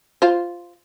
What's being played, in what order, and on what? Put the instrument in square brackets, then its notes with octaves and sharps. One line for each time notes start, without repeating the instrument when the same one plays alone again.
[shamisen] F4 C5